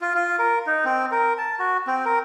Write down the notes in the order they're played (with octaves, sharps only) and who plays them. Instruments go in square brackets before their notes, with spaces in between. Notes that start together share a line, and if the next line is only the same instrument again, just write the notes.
[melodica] F4
F4
A#4
D#4
C4
A#4
A5
F#4
C4
A#4